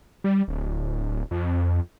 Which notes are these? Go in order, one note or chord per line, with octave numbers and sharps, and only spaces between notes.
G3
D1
F2